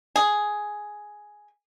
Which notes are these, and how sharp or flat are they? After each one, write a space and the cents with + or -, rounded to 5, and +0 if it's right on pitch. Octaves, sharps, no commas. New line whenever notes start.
G#4 +5